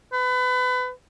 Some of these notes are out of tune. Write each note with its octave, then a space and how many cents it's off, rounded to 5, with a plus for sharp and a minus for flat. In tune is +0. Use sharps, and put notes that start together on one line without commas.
B4 +30